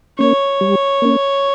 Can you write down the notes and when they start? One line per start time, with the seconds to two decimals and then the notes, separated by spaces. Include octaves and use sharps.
0.18 A#3 C#4 C#5
0.61 G3
1.02 A#3 C#4